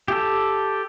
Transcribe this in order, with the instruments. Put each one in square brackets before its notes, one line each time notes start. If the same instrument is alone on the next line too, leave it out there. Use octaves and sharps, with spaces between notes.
[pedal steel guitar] G4 A4